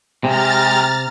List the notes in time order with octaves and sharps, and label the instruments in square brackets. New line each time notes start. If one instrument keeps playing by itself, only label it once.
[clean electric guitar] C3 [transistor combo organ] G#3 G4 [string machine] A#5 F6 A6